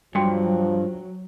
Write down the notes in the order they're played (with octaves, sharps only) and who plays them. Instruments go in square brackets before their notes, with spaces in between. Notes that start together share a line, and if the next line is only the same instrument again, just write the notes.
[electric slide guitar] G2 [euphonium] F3 [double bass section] F#3 [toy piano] F#4 G5